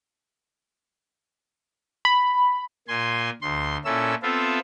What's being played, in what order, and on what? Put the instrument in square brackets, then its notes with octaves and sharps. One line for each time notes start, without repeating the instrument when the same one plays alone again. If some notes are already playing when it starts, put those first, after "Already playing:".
[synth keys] B5
[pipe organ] A#2 G#5 C6
D2 C6
A#2 C#4 E4 A4 E6
B3 C4 F4 A4 E5